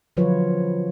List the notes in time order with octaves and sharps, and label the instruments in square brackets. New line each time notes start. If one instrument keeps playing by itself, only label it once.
[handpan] D3 F3 F#3 F4 B4 C#5